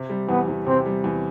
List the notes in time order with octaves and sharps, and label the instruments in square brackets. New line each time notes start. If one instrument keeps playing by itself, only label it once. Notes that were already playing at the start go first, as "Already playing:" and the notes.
Already playing: [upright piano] C3
G3
[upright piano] E2 [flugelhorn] B3
[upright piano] E2
[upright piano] C3 [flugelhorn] C4
[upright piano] G3
E2